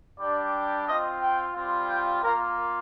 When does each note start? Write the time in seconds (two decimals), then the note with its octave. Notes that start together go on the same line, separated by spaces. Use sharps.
0.19 G3 D4 G4 D5
0.86 C4 F4 D#5
1.20 G5
1.54 G3 C4 F4
1.88 G5
2.22 A#3 F4 A#4